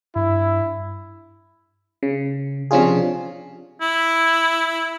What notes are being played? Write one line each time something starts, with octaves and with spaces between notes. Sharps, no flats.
G2 E4
C#3
C3 F3 C#4 D4 F4 G#4
E4